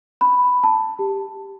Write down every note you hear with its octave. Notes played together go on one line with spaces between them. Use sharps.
B5
A5
G4